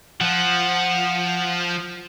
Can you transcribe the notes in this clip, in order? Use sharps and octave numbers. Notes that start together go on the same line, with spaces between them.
F3 F#5